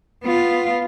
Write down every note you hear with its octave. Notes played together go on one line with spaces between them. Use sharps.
B3 F4